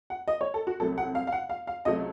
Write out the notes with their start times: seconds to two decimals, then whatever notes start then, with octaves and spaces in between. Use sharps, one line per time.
0.10 F#5
0.28 D#5
0.41 C#5
0.54 A4
0.67 F#4
0.80 C2 C3 F#3 A3 A4
0.98 F#5
1.15 F5
1.27 F5
1.32 F#5
1.49 F5
1.67 F5
1.85 C#2 C3 F#3 A3 D#5